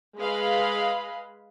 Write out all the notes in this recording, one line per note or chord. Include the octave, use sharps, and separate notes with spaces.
G#3 G#4 B4 D#5 F5 B5